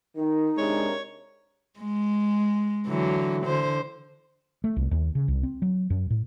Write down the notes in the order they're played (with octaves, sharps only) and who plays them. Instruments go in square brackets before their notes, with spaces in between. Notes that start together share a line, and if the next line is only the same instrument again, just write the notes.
[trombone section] D#3 [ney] D#4
[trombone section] C3 D4 A#4 [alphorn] G#3 [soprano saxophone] C#5
[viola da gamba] G#3
D3 E3 F#3
D3 C5
[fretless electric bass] A3
C2
D#2
C#3
C2
C4
F#3
F#2
A2